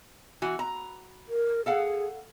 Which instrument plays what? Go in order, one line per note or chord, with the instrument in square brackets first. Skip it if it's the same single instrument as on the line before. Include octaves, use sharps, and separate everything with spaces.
[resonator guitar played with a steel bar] E3 F#4
A#5
[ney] A#4
[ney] G#4 [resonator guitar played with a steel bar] A4 F5 F#5